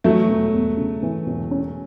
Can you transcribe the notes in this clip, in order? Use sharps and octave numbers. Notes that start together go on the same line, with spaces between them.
E3 F#3 A3
E1
E2
C#3
E3
E1
C#4